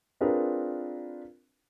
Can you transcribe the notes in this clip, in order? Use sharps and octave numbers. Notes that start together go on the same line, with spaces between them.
C4 D4 F4 G#4 A#4 B4